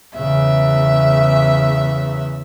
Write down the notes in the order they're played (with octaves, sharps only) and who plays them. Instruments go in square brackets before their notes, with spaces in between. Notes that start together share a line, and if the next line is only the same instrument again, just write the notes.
[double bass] E2 C#3 [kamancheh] E5